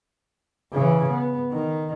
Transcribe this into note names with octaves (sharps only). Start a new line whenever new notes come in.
C#3 E3
B3
D#3